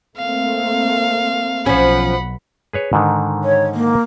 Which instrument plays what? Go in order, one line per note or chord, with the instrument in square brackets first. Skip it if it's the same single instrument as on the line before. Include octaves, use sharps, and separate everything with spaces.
[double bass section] A3 A#3 C4 [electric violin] F5
[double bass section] B1 [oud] F3 C#4 [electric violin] F#5 B5
[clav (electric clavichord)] G#4 B4 C#5
G#2 D3 D#3
[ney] C#5
A#3